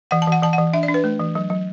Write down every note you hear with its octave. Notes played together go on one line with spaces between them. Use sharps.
E3 F#5
A5
E3 F#5
E3 A5
F#5
E3
D4 E5
D5
D4
B4
A3
E3
F#3
F#3